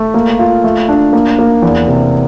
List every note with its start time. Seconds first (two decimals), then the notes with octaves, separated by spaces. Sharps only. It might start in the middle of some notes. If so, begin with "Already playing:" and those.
Already playing: A3
0.14 A#3
0.39 F4
0.64 A3
0.89 D4
1.13 A#3
1.39 A#3
1.62 E2
1.88 C3